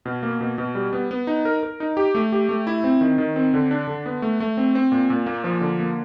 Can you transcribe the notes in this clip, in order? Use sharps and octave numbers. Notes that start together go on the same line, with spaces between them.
B2
A#3
B2
B2
G3
B3
B3
D#4
A#4
A#4
D#4
G4
A3
G4
A3
E4
C4
D#3
D#3
C4
D3
D4
D3
B3
A3
A3
C4
C4
A#2
A#2
A#3
F3
D3
A#3